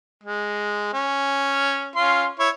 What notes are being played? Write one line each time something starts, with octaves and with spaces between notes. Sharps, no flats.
G#3
C#4
C#4 F4 C6
E4 C#5